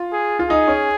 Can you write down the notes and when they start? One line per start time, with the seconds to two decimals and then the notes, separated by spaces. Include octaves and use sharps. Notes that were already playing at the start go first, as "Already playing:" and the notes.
Already playing: F4
0.13 G#4
0.39 F4
0.50 D#4 G#4
0.68 C#4